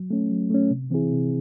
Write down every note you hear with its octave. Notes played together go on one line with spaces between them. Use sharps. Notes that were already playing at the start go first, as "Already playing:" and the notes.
Already playing: F#3
A3 C#4
F#3
A3 C#4
C3
E3 C4 E4 G#4
C3